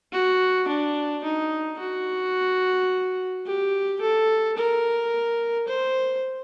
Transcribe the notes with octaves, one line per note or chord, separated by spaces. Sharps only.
F#4
D4
D#4
F#4
G4
A4
A#4
C5